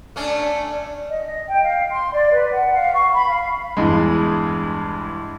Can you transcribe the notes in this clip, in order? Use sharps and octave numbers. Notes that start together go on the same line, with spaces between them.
A3 C#4 D4
D#5
D#5
G5
F5
C6
D5
B4
F#5
F5
C#6
B5
F5
E2 G2 G#3